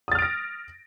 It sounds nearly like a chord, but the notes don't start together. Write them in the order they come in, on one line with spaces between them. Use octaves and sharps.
D#6 A6 F6 D7 A#6